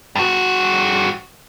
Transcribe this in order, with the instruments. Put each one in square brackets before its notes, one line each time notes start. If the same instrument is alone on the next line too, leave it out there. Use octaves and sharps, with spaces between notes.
[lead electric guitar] G2 F#4